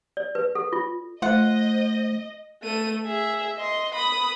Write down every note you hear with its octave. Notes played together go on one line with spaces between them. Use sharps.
D5
B4
A4
F4
A3 F4 C5 D#5 F#5
A3 D#7
G#4 E5
D#5 C6
B5 D#6